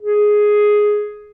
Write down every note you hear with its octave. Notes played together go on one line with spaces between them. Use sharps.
G#4